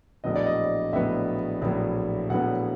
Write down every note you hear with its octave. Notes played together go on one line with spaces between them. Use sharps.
A#1 A2 F#3 B3 D#5
D5
D#5
A#1 A2 F#3 B3 E5
A#1 A2 F#3 B3
A#1 A2 F#3 B3 F#5